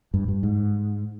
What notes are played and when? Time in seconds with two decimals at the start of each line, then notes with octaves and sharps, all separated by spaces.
0.14 G2
0.28 G2
0.43 G#2